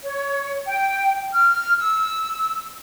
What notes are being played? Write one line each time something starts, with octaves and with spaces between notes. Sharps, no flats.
C#5
G5
F6
E6